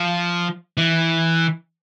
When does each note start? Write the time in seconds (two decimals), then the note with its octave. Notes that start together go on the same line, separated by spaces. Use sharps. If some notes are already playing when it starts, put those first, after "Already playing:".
Already playing: F3
0.77 E3